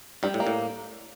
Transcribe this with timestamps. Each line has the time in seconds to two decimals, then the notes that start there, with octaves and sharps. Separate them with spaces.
0.23 G2 G3
0.34 A2
0.40 A#3
0.47 A2